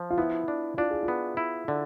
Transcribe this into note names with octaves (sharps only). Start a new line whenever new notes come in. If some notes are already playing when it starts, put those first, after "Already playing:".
Already playing: F3
F4
B3 E4
D4
D4 F4
G#4
F4
B3
E4
D3